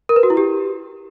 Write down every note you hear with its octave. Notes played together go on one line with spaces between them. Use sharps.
A#4
B4
F#4
E4
G4